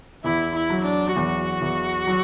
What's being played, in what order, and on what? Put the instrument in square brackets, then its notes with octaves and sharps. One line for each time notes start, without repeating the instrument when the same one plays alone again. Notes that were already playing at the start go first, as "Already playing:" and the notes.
[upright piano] E2 [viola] E4
[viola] E4
[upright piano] F#3
[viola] D4
[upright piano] E2 [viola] F#4
[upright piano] E2
F#3